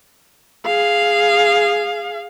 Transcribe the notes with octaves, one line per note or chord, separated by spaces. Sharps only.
G#4 F5